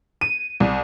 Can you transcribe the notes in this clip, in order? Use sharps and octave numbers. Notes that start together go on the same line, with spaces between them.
D#7
C2